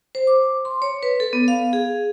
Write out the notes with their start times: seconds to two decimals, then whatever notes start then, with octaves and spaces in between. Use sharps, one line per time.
0.15 C5
0.27 D6
0.65 C6
0.82 C#5
1.03 B4
1.20 A4
1.33 B3
1.48 F5
1.73 G#4